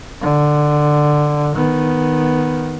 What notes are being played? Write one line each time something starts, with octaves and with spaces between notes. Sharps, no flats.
D3
D#3 B3